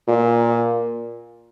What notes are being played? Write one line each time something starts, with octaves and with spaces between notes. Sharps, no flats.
A#2